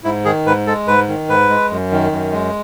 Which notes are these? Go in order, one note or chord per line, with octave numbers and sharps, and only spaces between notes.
G#2 E4
D#3 G#4
G#2 B4
G#3 A4
G#2 B4
D#3
G#2 B4
G#3
F#2
D#3
F#2
G#3